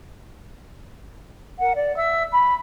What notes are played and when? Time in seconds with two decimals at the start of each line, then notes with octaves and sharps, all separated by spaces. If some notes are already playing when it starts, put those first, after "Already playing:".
1.58 A#4 F#5
1.74 D5
1.96 E5 E6
2.32 B5